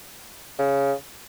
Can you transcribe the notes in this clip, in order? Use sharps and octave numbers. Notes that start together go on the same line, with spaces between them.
C#3